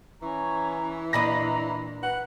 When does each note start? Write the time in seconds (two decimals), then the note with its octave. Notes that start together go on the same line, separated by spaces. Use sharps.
0.22 E3 C#4 A#5 C#6
1.13 A#2 D4 D#5 A#5 B5 A#6
2.03 B4 F#5